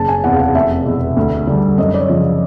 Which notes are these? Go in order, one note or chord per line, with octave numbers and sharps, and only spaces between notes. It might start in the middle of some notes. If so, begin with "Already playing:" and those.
Already playing: F#1 A5
G#5
E2 C3 F#5
F5
F#5
F1 E5
E2 B2
D2
D3 G3
F#2 D#5
D5
C#5
C#3 F3